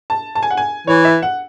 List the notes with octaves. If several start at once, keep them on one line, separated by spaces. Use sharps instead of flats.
A5
A5
G#5
F#5
G#5
E3 C#5
E5
F#5